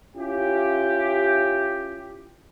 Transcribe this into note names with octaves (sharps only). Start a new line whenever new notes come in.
C#4 E4 F4 G4